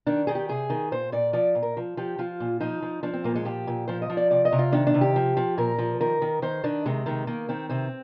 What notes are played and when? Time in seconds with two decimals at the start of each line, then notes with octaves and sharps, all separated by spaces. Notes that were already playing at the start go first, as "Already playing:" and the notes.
0.06 D#3 D4
0.27 D#3 G#4
0.35 G4
0.49 C3 G#4
0.70 D#3
0.92 A#2 C5
1.12 A#2 D5
1.33 F3 D5
1.55 A#2
1.63 A#4
1.77 F3
1.97 F3 G4
2.18 F3 F4
2.40 A#2
2.60 F3 D#4
2.82 F3
3.03 F3 D4
3.13 C4
3.24 A#2 A#3
3.35 G#3
3.45 F3 G4
3.67 A#2
3.88 F3 C5
4.02 D#5
4.10 F3
4.17 D5
4.31 C3 D5
4.45 D#5
4.52 C3
4.59 F4
4.72 D#3 D4
4.87 D4
4.94 C3
5.01 G4
5.16 F3
5.37 F3
5.58 A#2 A#4
5.78 F3
6.01 D#3 A#4
6.22 D#3
6.42 D#3 C5
6.64 D#3 D4
6.86 C3 G#3
7.06 D#3 G#3
7.27 D#3 A#3
7.49 D#3 C4
7.69 C3 C4